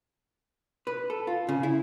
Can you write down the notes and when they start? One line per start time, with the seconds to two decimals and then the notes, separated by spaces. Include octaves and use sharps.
0.87 B4
1.10 A4
1.27 F4
1.49 C#3
1.63 E4